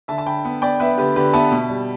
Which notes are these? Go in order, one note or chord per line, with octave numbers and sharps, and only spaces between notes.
D3 E5 A5
A5
D3 G5 B5
B3
B3 D5 G5
B3 B4 E5
D3 G4 B4
D3 G4 B4
B3 E5 A5
B2
G3